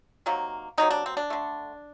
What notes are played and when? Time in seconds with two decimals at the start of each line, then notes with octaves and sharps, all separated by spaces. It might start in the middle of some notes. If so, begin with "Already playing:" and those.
0.26 C3 D#3 F#3 A#3
0.78 C3 D#3 F#3 A#3 D#4
0.91 D4
1.06 C4
1.17 D4
1.30 D3 A3